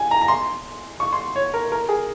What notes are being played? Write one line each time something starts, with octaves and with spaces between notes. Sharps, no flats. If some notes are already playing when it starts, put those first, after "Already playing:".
Already playing: G#5
A#5
A#5
C6
C#6
C6
C#5
A#4
A#4
G#4